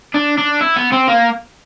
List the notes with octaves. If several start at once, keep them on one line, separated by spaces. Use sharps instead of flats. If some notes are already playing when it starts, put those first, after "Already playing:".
D4
D4
E4
B3
C4
A#3